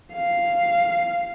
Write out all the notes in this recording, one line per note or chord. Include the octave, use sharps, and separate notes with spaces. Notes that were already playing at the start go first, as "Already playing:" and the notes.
F5